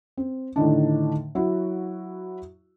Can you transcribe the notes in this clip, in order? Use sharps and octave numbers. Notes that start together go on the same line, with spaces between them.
C4
A2 D3 D#3 D4
F#3 E4 F#4